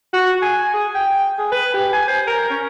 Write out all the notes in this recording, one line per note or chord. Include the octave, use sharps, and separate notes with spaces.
F#4
G#5
G#4
G5
G#4
B4
G4
G#5
C5
A#4
C#4